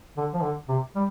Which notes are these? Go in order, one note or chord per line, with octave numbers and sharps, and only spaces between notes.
D3
F3
D3
C3
G3